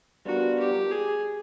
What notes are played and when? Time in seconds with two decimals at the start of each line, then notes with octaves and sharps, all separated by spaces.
0.25 G3 B3 D4 F4 F#4 A#4
0.59 G4
0.91 G#4